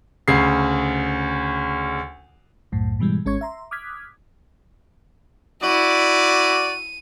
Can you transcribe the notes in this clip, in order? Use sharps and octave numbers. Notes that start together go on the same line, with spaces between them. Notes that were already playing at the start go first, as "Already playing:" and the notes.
D2 C#3 C7
C2 F#2 A2
G#2 B2 E3 G3 G#3
G#1 G#3 C#4 C#5 C#6 G#6
E5 A#5 C6
D6 D#6 F6 F#6 G#6 B6
E4 F#4 D5 D#7